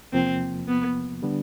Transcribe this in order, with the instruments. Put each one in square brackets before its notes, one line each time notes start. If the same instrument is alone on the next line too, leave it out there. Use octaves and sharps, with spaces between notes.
[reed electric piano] E2 C3 F3 A#3 [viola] C4
[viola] B3
[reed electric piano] D3 G3 B3 D4